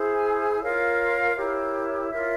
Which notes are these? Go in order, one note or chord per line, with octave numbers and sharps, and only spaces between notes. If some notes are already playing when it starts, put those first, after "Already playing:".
Already playing: E4 G#4 C5
G#5
G#5
F4 A#4 C#5 F5
E4 G4 A#4 C#5
F4 A#4 C#5 E5